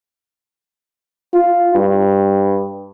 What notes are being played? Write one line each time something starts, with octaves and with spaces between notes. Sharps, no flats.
F4
G2